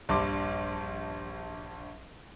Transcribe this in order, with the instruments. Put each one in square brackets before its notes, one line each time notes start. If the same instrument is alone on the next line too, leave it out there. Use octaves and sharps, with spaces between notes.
[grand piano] A#1 G2 C6 D6